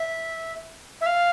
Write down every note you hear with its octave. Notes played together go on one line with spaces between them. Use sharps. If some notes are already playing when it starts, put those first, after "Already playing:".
Already playing: E5
E5
F5